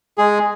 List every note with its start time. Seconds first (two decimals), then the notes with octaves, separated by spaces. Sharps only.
0.18 G#3 G#4